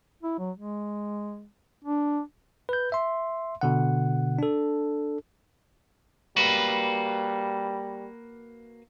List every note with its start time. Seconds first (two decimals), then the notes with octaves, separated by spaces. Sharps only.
0.23 E4
0.39 F#3
0.57 G#3
1.85 D4
2.69 B4 G6
2.92 E5 C6
3.61 B2 D3 F#5
4.39 D4 A4
6.36 G3 A#3 F#4 B4